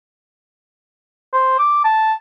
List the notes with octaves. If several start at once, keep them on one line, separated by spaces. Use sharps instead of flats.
C5
D6
A5